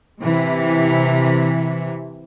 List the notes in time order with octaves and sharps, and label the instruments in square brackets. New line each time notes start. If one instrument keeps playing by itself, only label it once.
[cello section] C3 E3